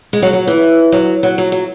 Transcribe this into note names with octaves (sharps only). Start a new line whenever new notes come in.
G#3
F#3
F#3
E3
F#3
F#3
F#3
F#3